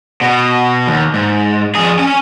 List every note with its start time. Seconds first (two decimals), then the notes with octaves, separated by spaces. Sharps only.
0.21 B2
0.87 D#2
1.14 G#2
1.75 F2 G#4
1.99 C#4 G#5